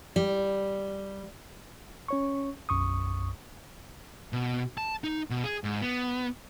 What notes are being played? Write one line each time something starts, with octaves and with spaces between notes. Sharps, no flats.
G3
C#4 C#5 C#6
B1 F#2 C#6 D#6
B2
A5
D#4
B2
G#4
G#2
B3